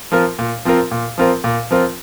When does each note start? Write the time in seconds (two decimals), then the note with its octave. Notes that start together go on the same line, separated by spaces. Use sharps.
0.12 F3 C4 F4 A#4
0.39 A#2
0.65 F3 C4 F4 A#4
0.91 A#2
1.18 F3 C4 F4 A#4
1.44 A#2
1.71 F3 C4 F4 A#4